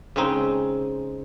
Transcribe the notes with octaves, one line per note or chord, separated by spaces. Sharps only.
C#3 G#3 C4 D#4